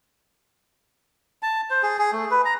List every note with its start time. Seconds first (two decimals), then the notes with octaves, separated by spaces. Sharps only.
1.43 A5
1.70 C5
1.83 G#4
1.98 G#4
2.12 A3
2.31 B4
2.45 A#5